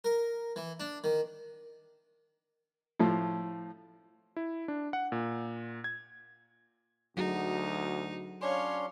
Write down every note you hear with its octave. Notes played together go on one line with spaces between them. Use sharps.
A#4
E3
D4
D#3
A2 F3
E4
D4
F#5
A#2
G#6
D2 F#3 D#4 F#4 G#4
C#4 D4 C#5 F5 C6